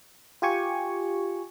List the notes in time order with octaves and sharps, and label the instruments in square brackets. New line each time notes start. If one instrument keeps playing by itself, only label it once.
[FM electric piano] F4 G4 G#5 C#6